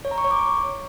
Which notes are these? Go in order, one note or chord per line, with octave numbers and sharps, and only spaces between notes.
C#5
A#5
C#6
C#5
D6